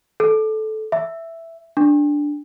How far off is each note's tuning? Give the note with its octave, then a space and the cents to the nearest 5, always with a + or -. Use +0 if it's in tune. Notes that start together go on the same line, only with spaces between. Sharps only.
A4 -15
E5 +5
D4 -5